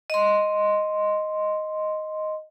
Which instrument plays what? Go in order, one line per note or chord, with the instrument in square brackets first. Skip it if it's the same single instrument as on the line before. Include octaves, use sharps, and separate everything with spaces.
[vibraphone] D#5 C6